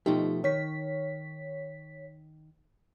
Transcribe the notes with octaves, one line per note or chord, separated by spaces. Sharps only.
B2 F3 A3 D#4 G4
D#3 C#5 B6